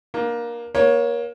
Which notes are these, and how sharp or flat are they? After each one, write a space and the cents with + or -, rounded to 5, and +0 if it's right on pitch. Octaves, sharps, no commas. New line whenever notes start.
A#3 +20 D4 +40
A#3 +30 C#5 +0